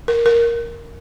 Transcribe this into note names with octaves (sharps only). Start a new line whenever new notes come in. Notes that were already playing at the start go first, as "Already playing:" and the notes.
A#4
A#4